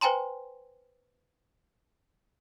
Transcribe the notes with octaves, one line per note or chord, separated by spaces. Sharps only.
B4 C5 G5 G#5 A#5 C6